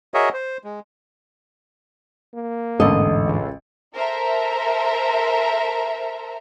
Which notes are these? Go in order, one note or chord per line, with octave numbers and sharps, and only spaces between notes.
F#4 G#4 A#4 C#5 D#5 E5
C5
G#3
A#3
A1 E2 G#2 D3 A4 D#5
C#2
A4 A#4 C5 E5 A#5